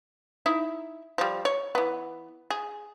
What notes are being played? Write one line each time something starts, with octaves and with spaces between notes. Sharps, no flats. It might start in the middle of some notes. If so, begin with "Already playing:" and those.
D#4 E4 E5
F3 G3
C#5
E3 B3
G#4